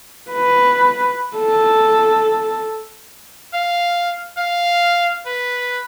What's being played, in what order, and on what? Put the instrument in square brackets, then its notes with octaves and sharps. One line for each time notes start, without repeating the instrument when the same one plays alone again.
[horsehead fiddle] B4
A4
[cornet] F5
F5
B4